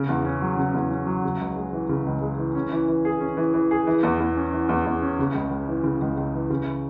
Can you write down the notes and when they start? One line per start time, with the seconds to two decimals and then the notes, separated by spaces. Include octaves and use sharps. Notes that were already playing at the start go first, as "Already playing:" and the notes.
Already playing: C#3
0.09 E2
0.25 C#4
0.42 F#3
0.57 C#3
0.74 E2
0.91 C#4
1.07 F#3
1.23 C#3
1.40 C#2
1.56 G#3
1.73 E3
1.89 C#3
2.06 C#2
2.22 G#3
2.38 E3
2.55 C#4
2.72 E3
2.88 E3
3.05 G#4
3.20 C#4
3.37 E3
3.54 E3
3.71 G#4
3.87 E3
4.03 E2
4.20 E2
4.37 C#4
4.53 E3
4.69 E2
4.86 E2
5.02 C#4
5.19 C#3
5.35 C#2
5.51 C#2
5.68 E3
5.84 C#3
6.01 C#2
6.17 C#2
6.34 E3
6.50 C#3